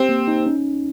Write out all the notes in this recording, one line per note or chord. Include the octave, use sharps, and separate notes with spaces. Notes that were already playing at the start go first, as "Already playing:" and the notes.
Already playing: C4 G4
A#3
D#4
C#4